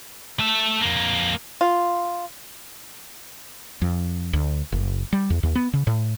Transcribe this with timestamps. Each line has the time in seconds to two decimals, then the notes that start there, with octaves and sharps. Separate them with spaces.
0.39 A3 E5
0.81 F2 A#3
1.61 F4
3.82 F2
4.33 D2
4.72 F#1
5.13 G3
5.30 E2
5.43 D#2
5.55 B3
5.73 C#3
5.87 A2